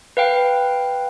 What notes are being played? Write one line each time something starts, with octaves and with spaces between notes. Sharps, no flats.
B4 F5 G5